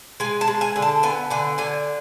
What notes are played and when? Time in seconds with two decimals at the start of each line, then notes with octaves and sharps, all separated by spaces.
0.20 G#3 G#5
0.41 A5
0.48 G#3
0.61 G#5
0.76 D3
0.82 A5
1.03 B3 G#5
1.30 D3 G#5
1.58 D3 G#5